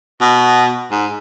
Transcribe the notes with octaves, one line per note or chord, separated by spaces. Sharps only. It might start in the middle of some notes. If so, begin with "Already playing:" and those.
B2
G#2